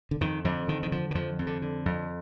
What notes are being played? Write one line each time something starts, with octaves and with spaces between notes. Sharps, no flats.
D3
F2 D#3
F2 D3
D3 D#3
D#3
D3 F3
D#3
F2 F3
F2
D3
D3
F2